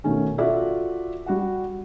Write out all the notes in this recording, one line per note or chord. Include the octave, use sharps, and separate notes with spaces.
B2 D#3 A3 C#4
F4 F#4 A4 D5 E5
G3 F#4 F#5